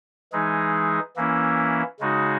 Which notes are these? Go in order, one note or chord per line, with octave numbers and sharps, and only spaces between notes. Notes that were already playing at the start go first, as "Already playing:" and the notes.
E3 G#3 D#4 G#4
E3 A#3 C#4 E4
C#3 G#3 D#4 F#4